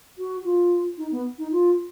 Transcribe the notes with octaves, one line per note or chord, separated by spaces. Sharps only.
F#4
F4
D#4
B3
D#4
F4